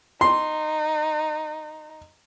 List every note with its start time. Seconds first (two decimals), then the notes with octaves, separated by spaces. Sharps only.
0.21 D#4 C6